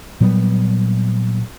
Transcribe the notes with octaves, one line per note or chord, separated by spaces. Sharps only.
A#2 F#3 G3 B3